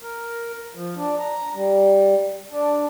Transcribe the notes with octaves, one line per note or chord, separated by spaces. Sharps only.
A#4
F3
D4
A#5
G3
D4